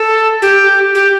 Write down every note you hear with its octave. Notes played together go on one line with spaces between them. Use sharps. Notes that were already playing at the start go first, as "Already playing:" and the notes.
Already playing: A4
G4
G4